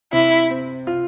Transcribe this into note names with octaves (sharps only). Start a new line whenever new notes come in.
C3 E4
C4
F4